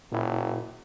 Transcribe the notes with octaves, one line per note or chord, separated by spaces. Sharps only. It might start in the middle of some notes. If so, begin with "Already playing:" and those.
F#1 A#2 E4